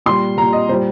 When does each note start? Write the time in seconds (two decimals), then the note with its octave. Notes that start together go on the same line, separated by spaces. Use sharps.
0.06 A#2 G3 C6
0.38 G3 A#5
0.41 A#2
0.53 D#5
0.69 A#2 G3 C5